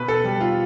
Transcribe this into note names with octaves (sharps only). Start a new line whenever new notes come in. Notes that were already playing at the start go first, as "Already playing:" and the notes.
Already playing: B2 B4
A4
G3
F4